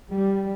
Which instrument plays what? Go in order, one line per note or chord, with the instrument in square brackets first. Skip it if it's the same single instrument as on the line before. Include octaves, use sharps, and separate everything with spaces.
[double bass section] G3